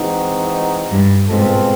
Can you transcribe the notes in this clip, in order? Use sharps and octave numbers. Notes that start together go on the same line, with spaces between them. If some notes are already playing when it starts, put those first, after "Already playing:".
Already playing: E3 G#3 C4 D#4 F#4
G2
G#2 B2 G#3 C4 F4 A4